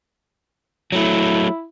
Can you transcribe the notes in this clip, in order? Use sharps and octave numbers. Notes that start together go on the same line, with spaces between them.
F#3 A3 E4